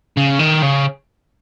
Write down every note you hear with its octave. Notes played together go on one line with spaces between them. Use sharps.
C#3
D#3
C#3